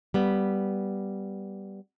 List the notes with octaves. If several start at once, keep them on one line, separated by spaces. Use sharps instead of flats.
G3 B3